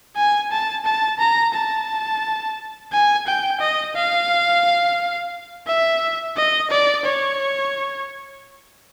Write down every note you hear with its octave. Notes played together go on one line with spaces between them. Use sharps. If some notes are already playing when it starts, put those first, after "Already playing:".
G#5
A5
A5
A#5
A5
G#5
G5
D#5
F5
E5
D#5
D5
C#5